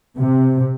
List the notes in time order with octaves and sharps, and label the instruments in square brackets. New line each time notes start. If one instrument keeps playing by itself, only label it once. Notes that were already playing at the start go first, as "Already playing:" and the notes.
[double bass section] C3